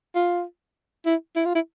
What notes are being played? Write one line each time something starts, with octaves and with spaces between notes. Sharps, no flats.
F4
E4
E4
F4
E4